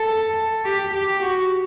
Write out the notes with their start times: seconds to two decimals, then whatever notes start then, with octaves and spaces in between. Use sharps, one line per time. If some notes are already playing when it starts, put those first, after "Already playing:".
Already playing: A4
0.65 G4
0.94 G4
1.23 F#4